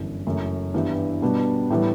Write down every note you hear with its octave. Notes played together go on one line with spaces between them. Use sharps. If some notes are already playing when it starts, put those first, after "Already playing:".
Already playing: G1 F#2 E3
F#1 F#2 E3 A3
G2 E3 B3 E4 G4
B2 G3 B3 D4
A2 E3 G3 B3